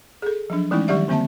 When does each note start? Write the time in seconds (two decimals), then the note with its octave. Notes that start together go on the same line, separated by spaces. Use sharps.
0.22 G#4 A4
0.50 F3 F#3 D4
0.71 E3 G#3 A3 C#4 D#4 E4
0.88 D#3 F#3 G3 G4 D5 E5
1.08 D3 A#3 C4 E5 A5